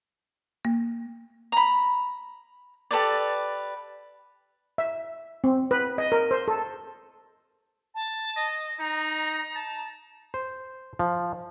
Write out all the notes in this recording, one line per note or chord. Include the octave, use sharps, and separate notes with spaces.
A#3
A#5 B5
G4 A4 B4 D5
E5
C4
B4
D#5
A#4
C5
A4
A5
D#5
D#4 A#5
A5
C5
F3